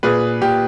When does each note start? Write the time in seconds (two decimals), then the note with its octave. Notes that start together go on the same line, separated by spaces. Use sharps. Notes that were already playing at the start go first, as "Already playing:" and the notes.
0.03 A#2 G#4 B4
0.41 A#2 G4